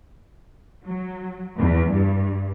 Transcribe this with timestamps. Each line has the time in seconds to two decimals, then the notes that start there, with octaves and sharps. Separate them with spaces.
0.84 F#3
1.57 E2
1.91 G2